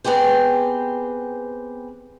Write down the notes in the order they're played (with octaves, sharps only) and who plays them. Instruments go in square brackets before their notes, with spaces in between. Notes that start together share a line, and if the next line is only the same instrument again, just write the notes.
[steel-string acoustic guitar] B3 C4 G4 G#4 C5